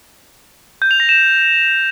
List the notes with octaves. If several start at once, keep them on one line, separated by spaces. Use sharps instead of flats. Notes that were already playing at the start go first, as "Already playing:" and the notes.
G6
F7
A#6
E7